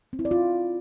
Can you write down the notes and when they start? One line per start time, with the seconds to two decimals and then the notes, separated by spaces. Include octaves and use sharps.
0.13 C4
0.19 E4
0.25 D5
0.31 F4